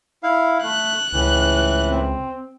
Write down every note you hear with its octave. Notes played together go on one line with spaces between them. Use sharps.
E4 F5
A3 F#6
C#2 A2 E3
C4